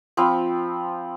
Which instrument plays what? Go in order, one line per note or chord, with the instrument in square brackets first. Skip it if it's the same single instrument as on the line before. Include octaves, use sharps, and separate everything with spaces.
[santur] F3 C4 B5